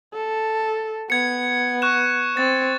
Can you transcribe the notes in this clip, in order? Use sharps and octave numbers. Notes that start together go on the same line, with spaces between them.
A4
B3 G#6 C#7
C#6 F#6 E7
C4 A6